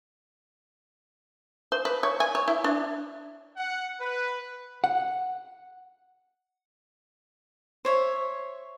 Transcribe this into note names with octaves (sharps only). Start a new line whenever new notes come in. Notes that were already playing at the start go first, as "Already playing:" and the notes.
C5
B4
C#5
G#5
C#5
E4
D4
F#5
B4
F#5
C5 C#5 E5